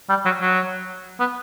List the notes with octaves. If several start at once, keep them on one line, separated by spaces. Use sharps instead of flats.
G3
F#3
F#3
B3